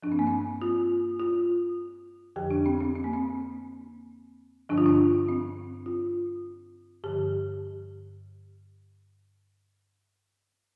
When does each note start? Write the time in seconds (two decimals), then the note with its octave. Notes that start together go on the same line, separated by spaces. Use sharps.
0.03 F3 D4
0.07 G2 C4
0.19 A#3
0.27 C4
0.62 F4
1.20 F4
2.36 F2 D3 F3 G4
2.51 D4
2.66 C4
2.81 C4
2.95 C4
3.04 A#3
3.14 C4
4.69 G2 D3 F3 D4
4.78 F4
4.86 D4
5.29 C4
5.86 F4
7.04 G2 D3 F3 G4